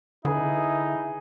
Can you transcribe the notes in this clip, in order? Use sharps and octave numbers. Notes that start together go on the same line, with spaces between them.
D3 D#4 E4 G#4 B4